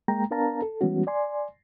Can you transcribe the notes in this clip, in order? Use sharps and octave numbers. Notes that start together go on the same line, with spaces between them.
G#3 A#3 G5 A#5
B3 D4 A#4 F5 A5 A#5
A4
E3 G3 G#3 B3 C#4 F#4
D5 G#5 C6